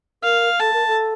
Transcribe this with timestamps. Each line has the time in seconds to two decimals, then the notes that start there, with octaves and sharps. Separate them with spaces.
0.23 A#4 F5
0.60 A4 A5
0.73 A#4
0.87 A4